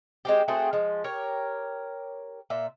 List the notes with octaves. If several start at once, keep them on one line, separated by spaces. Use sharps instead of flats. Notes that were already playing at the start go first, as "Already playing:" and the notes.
G#3 C4 G4
A3 C4 F#4 G#4
F3 G#3
G4 A#4 C#5
A#2 E5